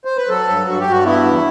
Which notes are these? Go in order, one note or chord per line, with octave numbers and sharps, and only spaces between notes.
C5
B4
F#3 A4
G2
G2 F#4
G4
G2 F#4
B3 E4
E2